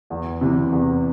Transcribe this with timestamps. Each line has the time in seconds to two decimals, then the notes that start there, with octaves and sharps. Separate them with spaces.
0.10 E2
0.41 C3 E3
0.72 E2